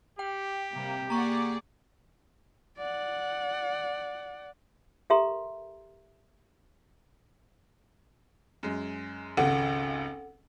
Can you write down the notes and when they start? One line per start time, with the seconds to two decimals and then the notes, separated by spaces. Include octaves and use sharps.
0.19 G4 G5
0.73 C3 G3 A#3
1.10 A#3 G#4 D5 F#5 A#5 C#6
2.78 D5 F#5
5.10 G4 A4 A#4 E5 A#5 C6
8.63 F#2 G#3
9.37 G#1 C#2 C#3 A4 F#5